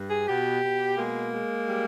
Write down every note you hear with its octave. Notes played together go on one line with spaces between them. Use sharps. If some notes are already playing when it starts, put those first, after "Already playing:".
Already playing: G2
G#4
B2 G4
B2
G#3 A#3
G#3
G3